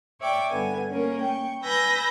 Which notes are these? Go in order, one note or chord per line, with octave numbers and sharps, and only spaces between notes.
C#5 D5 E5 G5 D6
G2 D3 B3 G#5
A#3 C#4 A#4
G5 C#6
B4 G#5 B5 E6 G6 A#6